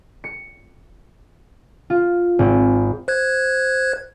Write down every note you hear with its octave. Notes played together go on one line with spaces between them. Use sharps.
C#7
F4
G#1
C5 F#6 G#6